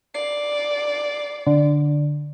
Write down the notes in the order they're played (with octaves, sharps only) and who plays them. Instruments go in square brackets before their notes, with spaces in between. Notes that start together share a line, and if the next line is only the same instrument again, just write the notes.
[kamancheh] D5 [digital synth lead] C7
[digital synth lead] D3